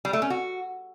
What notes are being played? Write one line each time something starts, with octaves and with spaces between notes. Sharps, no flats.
G3
A3
C#4
F#4